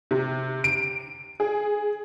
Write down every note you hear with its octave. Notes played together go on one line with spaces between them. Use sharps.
C3
D7
G#4